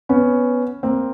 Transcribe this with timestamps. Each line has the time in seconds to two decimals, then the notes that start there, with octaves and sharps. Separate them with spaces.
0.09 B3 C#4
0.83 A#3 C4